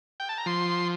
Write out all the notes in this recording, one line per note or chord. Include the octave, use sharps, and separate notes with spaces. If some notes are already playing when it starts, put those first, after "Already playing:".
G5
A5
A#5
F3 C6